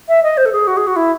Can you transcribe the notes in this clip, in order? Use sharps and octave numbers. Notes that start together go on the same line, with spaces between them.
E5
D#5
C5
A4
G#4
F#4
G#4
F#4
E4